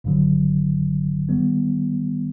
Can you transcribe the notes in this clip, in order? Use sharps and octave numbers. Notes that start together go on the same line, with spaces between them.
G1 G2 D3 F#3
D#3 G3 B3